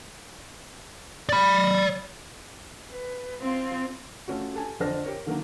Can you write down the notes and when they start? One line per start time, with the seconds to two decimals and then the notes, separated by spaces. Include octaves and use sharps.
1.29 D5 B5
2.91 B4
3.41 C4 F4
4.28 A3 C#4 F4 F#4
4.54 G4 A4 G#5
4.80 F2 D3 D4 C5 F6 A#6
5.04 G4 A#4 C#5
5.26 D3 D#3 F#3 A#3 A#4